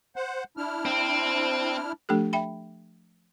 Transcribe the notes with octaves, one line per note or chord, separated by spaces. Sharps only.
C5 F#5
D4 E4 F6
C4
F3 A3 D4 G4 A4
E5 G5 B5